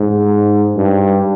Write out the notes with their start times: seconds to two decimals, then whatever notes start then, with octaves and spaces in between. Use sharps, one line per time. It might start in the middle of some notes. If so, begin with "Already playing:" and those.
Already playing: G#2
0.77 G2